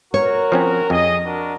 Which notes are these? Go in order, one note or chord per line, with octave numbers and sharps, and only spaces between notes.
F#4 A#4 C#5
F3 C4 C#4
F2 G#4 D#5
D4 F#4 A#4